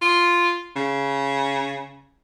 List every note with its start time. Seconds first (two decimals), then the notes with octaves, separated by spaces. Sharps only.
0.01 F4
0.76 C#3